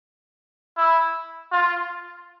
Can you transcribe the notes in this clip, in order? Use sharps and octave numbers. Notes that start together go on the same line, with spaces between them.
E4
F4